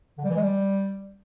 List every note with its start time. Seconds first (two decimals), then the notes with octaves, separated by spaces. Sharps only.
0.18 D3
0.24 G3
0.30 E3
0.36 G#3
0.42 G3